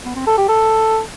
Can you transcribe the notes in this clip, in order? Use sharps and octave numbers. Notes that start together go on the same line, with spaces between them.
B3
C4
A4
G4
A4